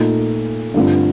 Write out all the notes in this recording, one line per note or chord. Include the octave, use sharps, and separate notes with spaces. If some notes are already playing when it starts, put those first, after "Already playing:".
Already playing: A#2 A3 D#4
G2 D3 A3 C4 F4